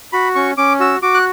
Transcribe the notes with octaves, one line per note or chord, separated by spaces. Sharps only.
F#4 B5
C#4 C#6
C#4 D6
F#4 E6
F#4 D6
F#6